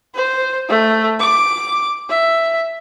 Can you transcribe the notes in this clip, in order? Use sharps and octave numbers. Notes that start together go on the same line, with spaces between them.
C5
A3
D6
E5